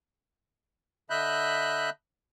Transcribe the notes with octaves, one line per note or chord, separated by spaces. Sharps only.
D3 D#5 E5 B5 F#6 G6